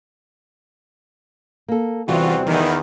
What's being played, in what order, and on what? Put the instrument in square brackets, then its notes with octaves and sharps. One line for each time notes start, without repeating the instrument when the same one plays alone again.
[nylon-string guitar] A#3 A4
[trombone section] E2 C4 F#4 [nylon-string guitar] C3 G3 [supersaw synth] E3 F4
[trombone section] E2 D#3 [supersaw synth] E3 B3